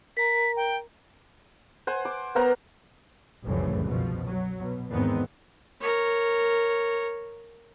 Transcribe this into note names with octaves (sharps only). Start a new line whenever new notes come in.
A#4 A#5 B6
G5
C5 F#5 G#5
D6
B3 A#4 C5 F#5
F1 C2 F#2 A2 C#3 E3
B2 F3
F#3
B2
E2 G#2 D#3 G#3 B3 C4
A#4 C#5